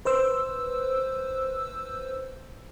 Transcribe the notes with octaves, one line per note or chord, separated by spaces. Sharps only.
B4 C5 E6